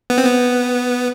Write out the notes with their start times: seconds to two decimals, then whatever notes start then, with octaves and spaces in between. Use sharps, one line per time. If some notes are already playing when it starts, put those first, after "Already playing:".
0.10 B3
0.18 C4
0.25 B3